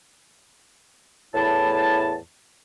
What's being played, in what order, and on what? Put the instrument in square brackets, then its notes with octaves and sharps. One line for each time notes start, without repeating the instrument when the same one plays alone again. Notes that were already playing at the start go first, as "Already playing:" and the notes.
[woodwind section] E2 A2 E4 A5